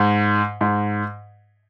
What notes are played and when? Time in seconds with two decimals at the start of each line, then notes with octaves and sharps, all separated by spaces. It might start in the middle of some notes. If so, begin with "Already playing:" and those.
Already playing: G#2
0.61 G#2